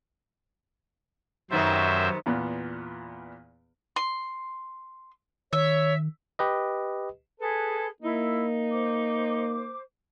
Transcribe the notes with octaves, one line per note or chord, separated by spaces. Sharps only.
F#2 C3 D#3 B3 C5 E5
E2 A#2 B3
C6
D#3 C#5 E5
G4 B4 D#5
G#4 A4 B4
A#3 D#4 E4
C5 D6